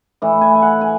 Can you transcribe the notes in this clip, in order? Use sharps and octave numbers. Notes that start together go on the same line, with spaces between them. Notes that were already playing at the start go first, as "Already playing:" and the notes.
A2 E3
G#5
G#5
F#5
G#5